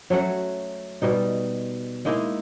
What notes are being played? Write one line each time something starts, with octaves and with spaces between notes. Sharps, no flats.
F#3 A3 C#4 F#5
B2 G3 D#4
G#3 A#3 D#4 E4